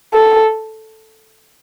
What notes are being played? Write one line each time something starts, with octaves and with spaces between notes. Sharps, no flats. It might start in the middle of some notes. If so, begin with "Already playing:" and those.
A4